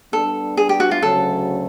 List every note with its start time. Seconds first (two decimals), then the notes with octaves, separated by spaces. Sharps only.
0.13 G3 B3 D4 A4
0.57 G#4
0.69 G4
0.80 F#4
0.91 F4
1.02 D2 C#3 F#3 A4